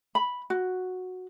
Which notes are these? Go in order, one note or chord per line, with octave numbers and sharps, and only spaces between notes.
B5
F#4